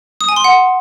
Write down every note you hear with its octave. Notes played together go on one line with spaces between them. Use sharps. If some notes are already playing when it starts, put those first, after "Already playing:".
D#6
G#5
C6
F#5